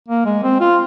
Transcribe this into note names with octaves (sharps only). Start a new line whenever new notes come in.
A#3
G#3
C4
F4